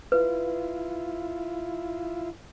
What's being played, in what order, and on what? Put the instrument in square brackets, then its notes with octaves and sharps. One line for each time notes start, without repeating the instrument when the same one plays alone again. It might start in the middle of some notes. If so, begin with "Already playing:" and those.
[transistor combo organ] E4 F4 [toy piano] B4